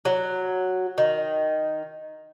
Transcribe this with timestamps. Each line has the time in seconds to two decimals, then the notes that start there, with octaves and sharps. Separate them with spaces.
0.05 F#3
0.98 D#3